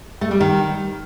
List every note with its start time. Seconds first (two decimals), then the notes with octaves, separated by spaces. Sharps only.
0.21 A3
0.31 G3
0.41 D#3